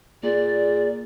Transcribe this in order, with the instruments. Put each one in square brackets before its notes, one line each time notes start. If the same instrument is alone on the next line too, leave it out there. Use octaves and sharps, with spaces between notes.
[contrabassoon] A#2 [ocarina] G#4 [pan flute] D5